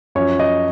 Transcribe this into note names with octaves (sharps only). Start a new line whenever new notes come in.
F#2 F3 C#5
D#5